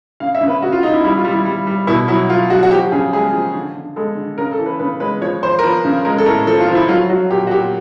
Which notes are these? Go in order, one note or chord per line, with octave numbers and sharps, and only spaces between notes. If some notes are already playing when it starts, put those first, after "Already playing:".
C#3 F5
E5
C#3
B4
C#3 F#4
F4
C#3 D#4
E4
G3 E4
F4
G3
E4
G3
G3
B2 E4
F#3 E4
F#3 F4
F#3 F#4
F#4
F3 G4
C#3 G#4
G#3 G#4
F3
D3
D3
G#3 A4
D3
C#3 A#4
A4
E3
B4
C#3 B4
G#3 B4
F3 C#5
F3 C5
A#4
F3 B4
C#3
G#3 A#4
A4
A2 A#4
F3 A4
F4
F3
E4
F#3 F4
F#3 F#4
A#2 G4
F#4
A#2 G4